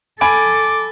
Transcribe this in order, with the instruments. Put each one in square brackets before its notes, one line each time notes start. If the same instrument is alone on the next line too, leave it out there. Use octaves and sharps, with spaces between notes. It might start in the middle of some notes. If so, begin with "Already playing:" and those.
[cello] A4 [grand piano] G#5 B5 D7 [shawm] D6